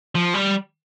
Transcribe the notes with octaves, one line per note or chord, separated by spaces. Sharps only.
F3
G3